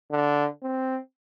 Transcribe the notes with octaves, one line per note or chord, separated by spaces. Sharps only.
D3
C4